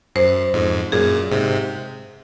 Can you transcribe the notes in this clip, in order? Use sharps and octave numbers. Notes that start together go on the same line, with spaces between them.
F#2 C5
F2 G#2
F#2 A#2 G#4
G#2 C3